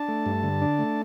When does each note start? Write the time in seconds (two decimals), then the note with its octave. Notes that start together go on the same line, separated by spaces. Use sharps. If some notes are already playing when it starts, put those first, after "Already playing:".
Already playing: D4 A5
0.08 A3
0.26 G2
0.43 D3
0.61 D4
0.79 A3